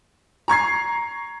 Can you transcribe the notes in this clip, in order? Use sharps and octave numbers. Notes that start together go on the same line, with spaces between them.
A#5 C#6 G#6 C7